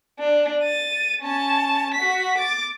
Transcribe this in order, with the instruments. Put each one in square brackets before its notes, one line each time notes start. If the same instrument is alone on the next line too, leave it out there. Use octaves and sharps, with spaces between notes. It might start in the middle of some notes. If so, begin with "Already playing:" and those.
[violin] D4
A6 D#7
C#4 A5
F#4 B6
D6 A6